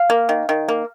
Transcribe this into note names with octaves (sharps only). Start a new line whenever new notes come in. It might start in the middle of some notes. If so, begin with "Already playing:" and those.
Already playing: F5
A#3
D#3
D#3
A#3